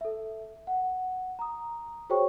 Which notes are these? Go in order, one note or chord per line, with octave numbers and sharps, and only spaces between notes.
A4 E5
F#5
A#5 D#6
F#4 G#4 C5 C#5 G5 C#6